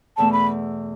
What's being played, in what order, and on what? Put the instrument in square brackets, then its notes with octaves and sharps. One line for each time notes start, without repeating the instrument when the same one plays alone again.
[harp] E2 B2 A3 [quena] A5
[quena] B5